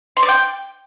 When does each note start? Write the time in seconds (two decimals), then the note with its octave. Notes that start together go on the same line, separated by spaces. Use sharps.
0.17 C6
0.23 D5
0.29 G5